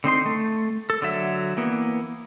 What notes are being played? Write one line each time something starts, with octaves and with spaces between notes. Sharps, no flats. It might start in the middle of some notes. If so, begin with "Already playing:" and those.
D3 C4 D#4 C6
A3
A4
D3 F#3 E5
E3 A#3 B3